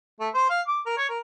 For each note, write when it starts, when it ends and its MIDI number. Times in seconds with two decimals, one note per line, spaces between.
0.20 0.29 57
0.34 0.47 72
0.50 0.61 77
0.68 0.80 86
0.86 0.97 70
0.98 1.07 73
1.09 1.18 70